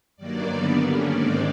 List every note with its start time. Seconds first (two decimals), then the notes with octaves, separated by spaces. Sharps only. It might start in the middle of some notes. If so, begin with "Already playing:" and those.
0.17 G2 D#3 F#3 A#3 D5
0.48 D3 G3 B3
0.78 D3 G3 A#3 C#4
1.09 G#2 D#3 G#3 C4 D5